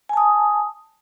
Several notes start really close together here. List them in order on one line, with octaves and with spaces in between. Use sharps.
G#5 A5 D#6